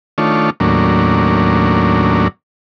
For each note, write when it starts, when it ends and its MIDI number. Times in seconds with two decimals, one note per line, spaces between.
0.18 0.50 51
0.18 0.50 57
0.18 0.50 62
0.18 0.50 65
0.18 0.50 73
0.60 2.28 39
0.60 2.28 45
0.60 2.28 54
0.60 2.28 58
0.60 2.28 61
0.60 2.28 62